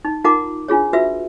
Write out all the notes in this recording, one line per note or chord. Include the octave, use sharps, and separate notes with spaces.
D#4
D#4 F4 A#4 F#5 A#5 D6
D4 F4 G#4 C#5
F4 F#4 B4 E5 E6